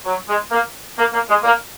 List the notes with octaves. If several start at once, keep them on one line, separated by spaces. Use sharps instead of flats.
F#3
G#3
A#3
A#3
A#3
G#3
A#3